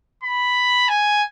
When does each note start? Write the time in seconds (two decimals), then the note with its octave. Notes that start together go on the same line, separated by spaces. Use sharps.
0.23 B5
0.88 G#5